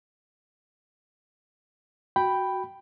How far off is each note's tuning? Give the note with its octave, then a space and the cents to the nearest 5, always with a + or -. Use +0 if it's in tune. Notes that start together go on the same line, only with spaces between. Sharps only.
F#4 +5 G5 +0 B5 +0